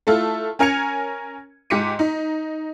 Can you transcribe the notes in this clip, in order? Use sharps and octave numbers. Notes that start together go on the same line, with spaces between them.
A3 E4 F4 A4
C#4 A#4 G#5 G#6 C#7 F7
G#2 G4 D6 B6 C#7 D#7
D#4